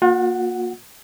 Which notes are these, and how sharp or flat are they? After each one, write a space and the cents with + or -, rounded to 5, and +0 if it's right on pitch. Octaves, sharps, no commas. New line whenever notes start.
A#3 +0 F4 +45 F#5 +5